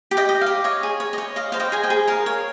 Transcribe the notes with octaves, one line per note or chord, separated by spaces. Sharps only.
G4
D#5 G5
D#5
F5
G4
C#5 D#5
G#4
C#5
C#5 D#5
D#5 F5
C5 F5
D#5 G5
G#4 G#5
D#5 G5
G#4
A#4 F5
C#5